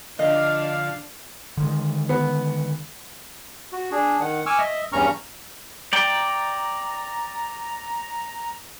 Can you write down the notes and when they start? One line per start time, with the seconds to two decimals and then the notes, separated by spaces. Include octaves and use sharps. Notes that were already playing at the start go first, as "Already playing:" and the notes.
0.19 D3 F3 D4 D#5 F5
1.57 D3 D#3 G#3
2.09 B3
3.72 F#4
3.92 D4 G#4
4.21 D#3 F#5
4.46 G#5 C#6 D6 E6 F6
4.59 D#5 E5
4.93 E2 G2 C#4 A#5 C#6 F6
5.93 D5 G5 A#5